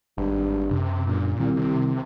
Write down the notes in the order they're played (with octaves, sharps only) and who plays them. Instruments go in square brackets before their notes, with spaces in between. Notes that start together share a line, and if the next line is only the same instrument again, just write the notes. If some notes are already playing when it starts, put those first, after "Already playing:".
[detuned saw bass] G#1 [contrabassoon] G2
[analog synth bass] F#2 [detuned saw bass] C3
[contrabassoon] G1 [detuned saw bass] A#2
[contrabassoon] C2 [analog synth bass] D#3
[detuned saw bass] C3